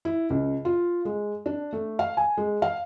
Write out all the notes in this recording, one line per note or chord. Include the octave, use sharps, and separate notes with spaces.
E4
C#2
F4
G#3
D4
A3
F5
G#5
G#3
F5